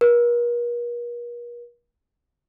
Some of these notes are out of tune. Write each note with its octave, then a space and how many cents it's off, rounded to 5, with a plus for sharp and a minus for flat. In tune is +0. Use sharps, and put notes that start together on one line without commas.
A#4 +45